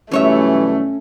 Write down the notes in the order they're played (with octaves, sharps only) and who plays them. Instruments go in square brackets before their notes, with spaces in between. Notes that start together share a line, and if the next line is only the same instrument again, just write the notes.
[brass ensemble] B1 E3 G3 [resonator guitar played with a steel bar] F#2 C#5 E5 [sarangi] A3 [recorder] C#4